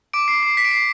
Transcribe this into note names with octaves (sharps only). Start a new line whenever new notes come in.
D6 D7
C7
C7
B6
D7
C7